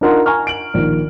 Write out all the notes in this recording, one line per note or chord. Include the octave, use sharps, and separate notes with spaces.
D4 D#4 F4 A#4 F#5 C6
G#5 A#5 C#6 F6
D7 F#7
A#1 D#3